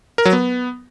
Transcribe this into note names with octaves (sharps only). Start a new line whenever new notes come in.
A#4
F#3
B3